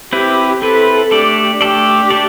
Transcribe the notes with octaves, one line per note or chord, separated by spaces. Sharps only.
C4 E4 G4 B4
C4 E4 A4 B4
A3 D4 G4 A4 D5
A3 D4 G4 A4 D5
A3 D4 A4 D5